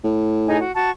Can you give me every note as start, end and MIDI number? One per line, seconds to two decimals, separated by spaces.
0.04 0.63 45
0.47 0.58 63
0.47 0.58 68
0.47 0.58 80
0.60 0.73 66
0.75 0.90 66
0.75 0.90 81
0.75 0.90 85